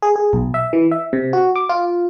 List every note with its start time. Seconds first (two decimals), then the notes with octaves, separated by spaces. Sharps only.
0.02 G#4
0.16 G#4
0.33 B1
0.54 E5
0.73 E3
0.92 E5
1.13 C3
1.33 F#4
1.56 D6
1.69 F4